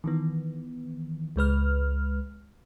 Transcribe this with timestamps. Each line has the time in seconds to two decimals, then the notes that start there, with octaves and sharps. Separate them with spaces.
0.04 D#3 E3 B3
1.36 C#2 G#3 B4 F6